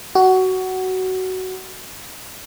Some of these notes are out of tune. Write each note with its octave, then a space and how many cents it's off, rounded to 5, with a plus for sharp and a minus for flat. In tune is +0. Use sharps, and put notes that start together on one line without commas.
F#4 +15